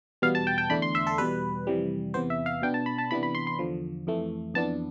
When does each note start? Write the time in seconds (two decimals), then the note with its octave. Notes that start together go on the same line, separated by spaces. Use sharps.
0.22 E2 B2 G3 B3 F5
0.35 A5
0.47 G5
0.58 G5
0.70 E2 D3 A3 D4 B5
0.82 C6
0.95 E5
1.07 A4
1.18 E2 B2 G3 B4
1.67 F2 C3 E3 G3
2.14 E2 C3 E3 B3 C5
2.30 E5
2.46 F5
2.62 B2 B3 D4 G5
2.74 A5
2.86 B5
2.98 A5
3.11 C3 E3 B3 D4 B5
3.23 B5
3.35 C6
3.47 C6
3.59 E2 D3 F3
4.07 F2 E3 A3
4.54 F2 E3 B3 D4 A5